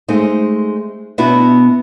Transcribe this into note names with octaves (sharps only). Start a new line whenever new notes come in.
G#3 A3 C4 D#4
B2 B3 D4 E4 F#4